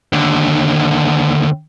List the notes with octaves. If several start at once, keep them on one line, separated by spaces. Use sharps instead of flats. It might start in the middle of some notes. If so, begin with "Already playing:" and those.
D#2 D3